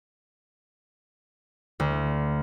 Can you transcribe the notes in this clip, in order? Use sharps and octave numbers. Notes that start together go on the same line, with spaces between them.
D2